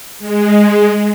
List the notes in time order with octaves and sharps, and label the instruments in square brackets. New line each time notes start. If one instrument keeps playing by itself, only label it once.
[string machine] G#3